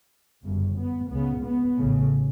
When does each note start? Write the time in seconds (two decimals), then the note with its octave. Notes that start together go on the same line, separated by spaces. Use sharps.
0.43 G1 F#2 C#3
0.76 B3
1.10 C#2 C#3 B3
1.44 B3
1.78 A1 A2 C#3